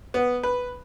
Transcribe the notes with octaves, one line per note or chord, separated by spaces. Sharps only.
B3
B4